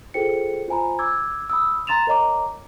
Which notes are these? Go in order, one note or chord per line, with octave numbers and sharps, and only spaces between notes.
F4 G#4 A4 C5 G5 C#7
F4 C5 G#5 A#5 B5
D6 E6 G#6
B5 D#6 E6
A#5 C6 A6 E7 F7
A#4 C#5 D#5 A#5 D6